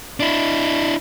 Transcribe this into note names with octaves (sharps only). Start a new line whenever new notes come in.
D4 E4